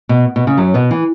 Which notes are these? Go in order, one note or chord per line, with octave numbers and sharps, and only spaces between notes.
B2
B2
C#3
F#2 F#3
B2 B3
E3